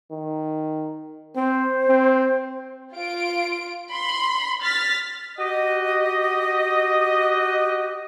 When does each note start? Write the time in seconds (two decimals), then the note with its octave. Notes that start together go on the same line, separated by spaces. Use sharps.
0.11 D#3
1.36 C4 C5
1.88 C4
2.93 F4 D7
3.91 B5 C6
4.62 F6 A6 B6
5.39 F#4 G4 D#5